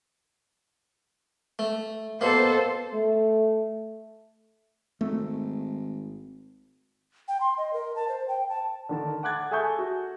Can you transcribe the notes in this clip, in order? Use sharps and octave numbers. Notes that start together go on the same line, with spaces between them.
A3
B2 A#3 A4 C5
A3
G#1 A3
G5
C6
D#5
A#4
A5
C5
G5
A5
D3 D#3 A5
F#5 D6 F#6 G#6 A6
G#4 A4 E5 A5 C#6 G6
F#4